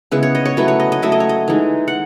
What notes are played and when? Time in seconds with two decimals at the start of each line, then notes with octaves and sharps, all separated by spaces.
0.11 C#3 G#3 B3 E4 B4
0.23 C#5
0.35 D#5
0.45 C#5
0.57 F#3 A3 E4 B4
0.68 C#5
0.80 D#5
0.92 D#5
1.02 F#3 A3 E4 E5
1.12 D#5
1.20 C#5
1.29 D#5
1.48 E3 G#3 D#4
1.88 F#5